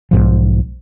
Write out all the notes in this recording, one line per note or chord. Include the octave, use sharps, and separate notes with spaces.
B1 G#2 F3